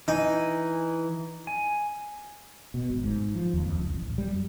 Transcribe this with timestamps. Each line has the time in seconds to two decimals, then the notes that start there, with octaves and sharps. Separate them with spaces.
0.08 E3 D#4 D#5 G#5
1.47 G#5
2.74 B2
2.90 G#1
3.04 G#2
3.35 F3
3.54 D#2
3.66 F2
3.79 C#2
3.94 A1
4.18 G3
4.34 F#2